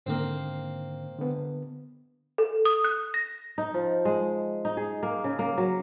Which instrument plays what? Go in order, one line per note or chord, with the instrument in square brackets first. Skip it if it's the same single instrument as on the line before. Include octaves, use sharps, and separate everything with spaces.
[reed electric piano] G#2 D3 D#3 [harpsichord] A#3 C4
[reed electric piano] D3 B3
[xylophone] A4
D#6
F#6
A#6
[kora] D#4
F3
G#3
D#4
G#4
A#3
C#3
A#3
F#3